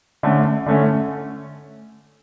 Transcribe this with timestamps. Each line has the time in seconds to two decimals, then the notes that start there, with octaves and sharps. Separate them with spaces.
0.23 D3 A3 C#4
0.66 D3 A3 C#4